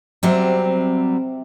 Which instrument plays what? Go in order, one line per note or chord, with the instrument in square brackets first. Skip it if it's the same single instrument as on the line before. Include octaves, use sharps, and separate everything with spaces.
[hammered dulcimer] C3 [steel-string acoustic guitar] F#3 G3 C4